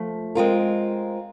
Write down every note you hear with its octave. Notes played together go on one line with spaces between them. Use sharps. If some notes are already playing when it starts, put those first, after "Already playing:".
Already playing: F3 A3
G#3 C4 F4 A#4